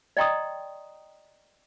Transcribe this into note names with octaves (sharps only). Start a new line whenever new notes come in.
D5 D#5 G5 A#5 C6 D#6